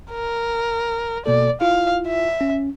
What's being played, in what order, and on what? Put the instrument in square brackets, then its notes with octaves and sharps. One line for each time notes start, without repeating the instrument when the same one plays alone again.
[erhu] A#4
[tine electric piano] B2 A#3 A4 [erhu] D5
[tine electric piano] E4 F4 [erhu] F5
[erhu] E5
[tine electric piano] C#4